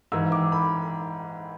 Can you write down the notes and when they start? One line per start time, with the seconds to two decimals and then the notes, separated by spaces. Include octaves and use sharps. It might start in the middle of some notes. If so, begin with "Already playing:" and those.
0.12 G#2 E3 E6
0.32 D6
0.52 B5